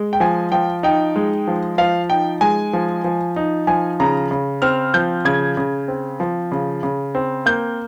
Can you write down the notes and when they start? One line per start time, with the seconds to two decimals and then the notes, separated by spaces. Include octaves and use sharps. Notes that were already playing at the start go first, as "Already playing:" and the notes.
Already playing: G#3
0.13 G5
0.20 F3 G#5
0.52 F3 G5
0.83 D#4 G5
1.16 G#3
1.48 F3
1.78 F3 F5
2.10 D#4 G5
2.41 G#3 G#5
2.73 F3
3.04 F3
3.36 D#4
3.67 F3 G#5
4.00 C#3 A#5
4.31 C#3
4.62 C4 F6
4.94 F3 G6
5.25 C#3 G#6
5.57 C#3
5.88 C4
6.20 F3
6.52 C#3
6.83 C#3
7.15 C4
7.46 A#3 G6